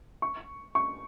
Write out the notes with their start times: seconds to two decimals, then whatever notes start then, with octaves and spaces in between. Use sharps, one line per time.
0.22 C#6
0.75 C#6